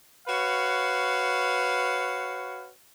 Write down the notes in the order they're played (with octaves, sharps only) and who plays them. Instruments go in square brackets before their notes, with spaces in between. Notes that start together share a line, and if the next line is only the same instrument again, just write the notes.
[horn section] F#4 B4 C#5 F5